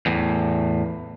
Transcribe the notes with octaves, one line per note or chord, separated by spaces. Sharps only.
E2 A2